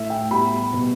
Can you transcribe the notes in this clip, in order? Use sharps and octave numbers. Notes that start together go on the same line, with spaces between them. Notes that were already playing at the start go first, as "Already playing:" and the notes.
Already playing: A2 A3 E5
G5
A2 G3 B3 B5
B2 B3